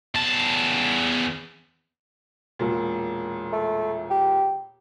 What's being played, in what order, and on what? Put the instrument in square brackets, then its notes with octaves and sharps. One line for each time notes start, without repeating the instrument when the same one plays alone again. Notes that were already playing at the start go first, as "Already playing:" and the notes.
[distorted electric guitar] E2 A5
[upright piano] E1 A#2
[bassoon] A3
G4